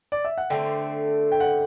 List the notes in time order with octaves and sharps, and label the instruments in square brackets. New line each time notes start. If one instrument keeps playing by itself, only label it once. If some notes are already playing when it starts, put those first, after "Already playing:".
[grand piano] D5
E5
F#5
[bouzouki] D3 A3 C4 [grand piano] G5
[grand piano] G5
F#5